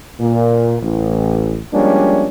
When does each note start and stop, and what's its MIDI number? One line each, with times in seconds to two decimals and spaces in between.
0.20 0.78 46
0.82 1.61 33
1.74 2.28 53
1.74 2.28 55
1.74 2.28 56
1.74 2.28 58
1.74 2.28 61
1.74 2.28 62